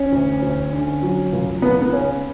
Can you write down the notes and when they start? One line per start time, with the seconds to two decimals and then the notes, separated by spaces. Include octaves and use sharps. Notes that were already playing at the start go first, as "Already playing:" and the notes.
Already playing: C#4
0.12 D2
0.42 D2
0.72 D3
1.02 F#3
1.33 C#2
1.62 C#2 B3
1.82 B3
1.93 C#3 C#4